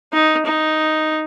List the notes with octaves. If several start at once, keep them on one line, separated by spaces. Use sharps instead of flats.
D#4
D#4